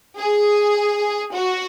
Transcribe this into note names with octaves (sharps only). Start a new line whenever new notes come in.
G#4
F#4